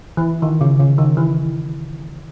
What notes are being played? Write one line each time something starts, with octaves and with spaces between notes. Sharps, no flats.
E3
D#3
C#3
C#3
D#3
E3